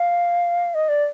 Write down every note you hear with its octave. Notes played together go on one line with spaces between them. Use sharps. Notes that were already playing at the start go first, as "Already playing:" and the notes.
Already playing: F5
D#5
D5